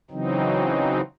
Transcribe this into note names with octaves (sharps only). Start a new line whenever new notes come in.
C#3 E3 F#3 C4 D#4